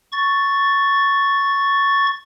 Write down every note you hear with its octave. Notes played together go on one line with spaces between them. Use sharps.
C#6 A6